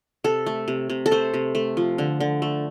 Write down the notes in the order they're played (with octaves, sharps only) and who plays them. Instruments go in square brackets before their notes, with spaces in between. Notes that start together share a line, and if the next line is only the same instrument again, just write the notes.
[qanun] C3 A4
A3
C3
C3
A4
A3 C5
C3
A3
F3
D3
D3
A3